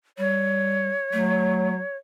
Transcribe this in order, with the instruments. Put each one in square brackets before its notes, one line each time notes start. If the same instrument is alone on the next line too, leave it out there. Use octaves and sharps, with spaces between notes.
[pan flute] G3 [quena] C#5
[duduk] F#3 [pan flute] A3